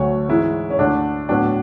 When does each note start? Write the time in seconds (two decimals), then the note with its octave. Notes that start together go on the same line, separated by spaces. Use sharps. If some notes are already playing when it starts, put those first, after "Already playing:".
Already playing: D2 D3 F#3 A3 C#5
0.29 G#2 E3 G#3 E4
0.70 C#4
0.79 D2 D3 A3 D4
1.29 A2 F#3 B3 D4